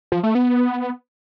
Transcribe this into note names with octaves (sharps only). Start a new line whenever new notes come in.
F3
A3
B3